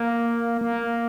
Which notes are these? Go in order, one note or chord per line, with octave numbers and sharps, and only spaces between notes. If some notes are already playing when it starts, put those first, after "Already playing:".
Already playing: A#3
A#3